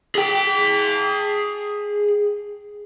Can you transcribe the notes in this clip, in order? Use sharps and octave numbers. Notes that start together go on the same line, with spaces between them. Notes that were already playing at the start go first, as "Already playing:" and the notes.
G#4 G5